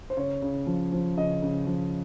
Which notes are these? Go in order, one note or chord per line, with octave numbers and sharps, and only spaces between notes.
C5
C#3 C#5
C#3
F3
F3
C#3 D#5
C#3
F3